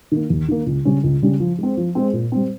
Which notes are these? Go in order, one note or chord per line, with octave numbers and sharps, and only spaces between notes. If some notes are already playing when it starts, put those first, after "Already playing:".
D#3 A#3
D#2
D#3 A#3
C#2
C#3 G3 C#4
C#2
C#3 G3 C#4
F3
G#3 C4
F3
G#3 C4
A#2
G3 C4